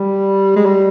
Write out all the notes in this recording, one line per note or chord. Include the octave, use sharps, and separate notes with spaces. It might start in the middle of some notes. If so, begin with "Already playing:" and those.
Already playing: G3
G#3
G3